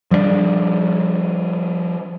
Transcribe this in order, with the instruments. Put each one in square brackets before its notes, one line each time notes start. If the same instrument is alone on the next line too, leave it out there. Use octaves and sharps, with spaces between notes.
[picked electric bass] F3 G3 A3 D4